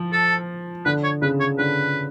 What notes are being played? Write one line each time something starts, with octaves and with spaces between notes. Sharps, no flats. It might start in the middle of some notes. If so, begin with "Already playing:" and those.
Already playing: F3
A4
D3 B4
C#5
C#3 B4
C#5
D3 B4